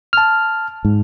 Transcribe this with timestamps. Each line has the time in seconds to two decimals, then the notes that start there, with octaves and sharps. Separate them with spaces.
0.13 A5 F6
0.85 G#2